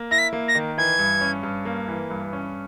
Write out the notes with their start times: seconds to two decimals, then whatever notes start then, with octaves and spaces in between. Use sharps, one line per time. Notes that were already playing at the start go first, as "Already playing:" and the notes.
Already playing: A#3
0.11 E4 A#6
0.18 B6
0.33 A#3
0.48 A#6
0.55 D#3
0.78 E3 G#6
0.99 G2
1.21 C#4
1.43 G2
1.65 A#3
1.88 E3
2.10 G2
2.33 C#4